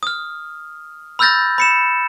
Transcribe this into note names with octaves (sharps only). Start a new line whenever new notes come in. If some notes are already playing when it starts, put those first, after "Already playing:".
D#6 F6
B5 E6 F6 G6 A6 A#6
B5 C#7 E7